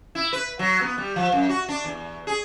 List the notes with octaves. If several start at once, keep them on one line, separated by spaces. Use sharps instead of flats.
E4
B4
F#3
B3
G3
F3
F#2
F#4
D4
E2
G#4